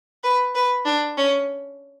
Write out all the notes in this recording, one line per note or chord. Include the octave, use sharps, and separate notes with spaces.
B4
B4
D4
C#4